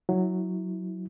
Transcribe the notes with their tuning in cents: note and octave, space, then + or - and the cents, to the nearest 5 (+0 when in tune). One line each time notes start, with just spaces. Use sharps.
F#3 +0 E4 -20